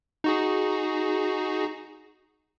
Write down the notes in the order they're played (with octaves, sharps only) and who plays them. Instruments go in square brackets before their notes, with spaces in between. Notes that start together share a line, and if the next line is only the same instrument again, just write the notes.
[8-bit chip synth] D#4 F#4 G#4